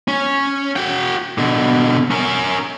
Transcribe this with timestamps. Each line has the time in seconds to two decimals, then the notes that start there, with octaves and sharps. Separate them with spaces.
0.08 C#4
0.76 F#4 G5
1.38 B2 D3
2.11 C#4 A#4